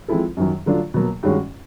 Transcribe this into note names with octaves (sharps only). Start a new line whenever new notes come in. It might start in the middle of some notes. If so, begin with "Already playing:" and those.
F3 G#3 C4 E4 A4
F#2 D#3 F#3
D3 F#3 A3 D4 F4
B2 F#3 A#3
G2 D#3 G#3 C#4 F#4